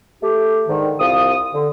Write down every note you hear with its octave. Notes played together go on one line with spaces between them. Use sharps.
A3 G4
G#2 D3 D#3
C2 F4 D#6
D3